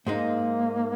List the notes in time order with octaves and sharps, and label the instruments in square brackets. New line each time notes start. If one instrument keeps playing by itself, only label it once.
[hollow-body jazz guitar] G#2 G#3 D#4 [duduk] A#3